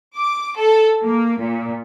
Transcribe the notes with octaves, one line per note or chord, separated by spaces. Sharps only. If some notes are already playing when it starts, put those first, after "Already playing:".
D6
A4
A#3
A#2